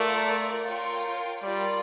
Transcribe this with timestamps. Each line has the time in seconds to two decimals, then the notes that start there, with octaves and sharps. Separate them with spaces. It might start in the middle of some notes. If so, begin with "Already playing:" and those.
Already playing: A3 F4 A#4 D5
0.66 F4 A#4 C#5 G5
1.42 G3 F4 A#4 D5